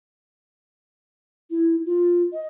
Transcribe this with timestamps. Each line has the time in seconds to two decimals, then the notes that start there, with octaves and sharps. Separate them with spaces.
1.50 E4
1.85 F4
2.33 D#5